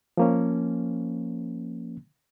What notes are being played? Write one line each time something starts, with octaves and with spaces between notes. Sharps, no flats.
F3 A#3 C#4